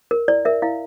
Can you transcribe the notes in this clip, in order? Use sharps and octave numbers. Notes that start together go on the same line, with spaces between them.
A#4
E4 D5
A#4 E5
E4 F5